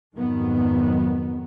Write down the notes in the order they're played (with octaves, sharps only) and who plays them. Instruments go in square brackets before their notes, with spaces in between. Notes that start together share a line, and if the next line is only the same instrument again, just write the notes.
[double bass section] F2 G#2 D#3 F#3 B3